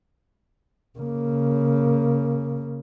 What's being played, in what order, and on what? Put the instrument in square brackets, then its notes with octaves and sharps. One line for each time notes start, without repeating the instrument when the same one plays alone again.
[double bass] C#3 A#3